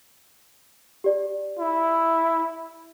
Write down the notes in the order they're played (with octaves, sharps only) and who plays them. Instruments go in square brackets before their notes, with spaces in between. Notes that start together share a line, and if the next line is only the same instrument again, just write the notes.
[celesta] G4 D5
[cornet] E4